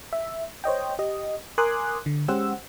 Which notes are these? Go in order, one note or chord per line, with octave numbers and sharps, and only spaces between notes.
E5
C5 C#5 D#5 G5
G4 D#5
A#4 G#5 C6 D6 D#6 F#6
D3
G#3 C#4 G4 C5 F#5 E6